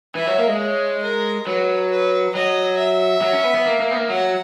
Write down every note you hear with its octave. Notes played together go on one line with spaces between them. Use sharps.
E3 E5
F#3
A#3
G#3
C#5
A#4
F#3 B4
B4
F#3 D#5
E5
F#3
C#4
B3
B3
A#3
A#3
B3
A#3
F#3 F#5